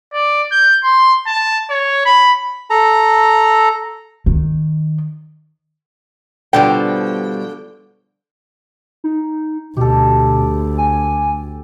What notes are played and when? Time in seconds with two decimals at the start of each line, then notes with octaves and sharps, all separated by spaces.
0.13 D5
0.52 G6
0.84 C6
1.27 A5
1.70 C#5
2.06 B5
2.70 A4 A#5
4.26 D#3
6.53 B2 D3 F3 G3 G5
9.04 D#4
9.77 D2 B2 G4 A4
10.78 G#5